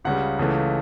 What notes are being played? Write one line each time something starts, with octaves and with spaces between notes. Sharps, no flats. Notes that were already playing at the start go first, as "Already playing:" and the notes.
C#2 C#3 G3 F#5
C#2 C#3 E3 A3